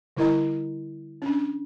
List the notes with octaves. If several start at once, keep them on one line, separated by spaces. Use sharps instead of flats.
D3 G3 E4 A#4 D#5 A#5
C#4 D4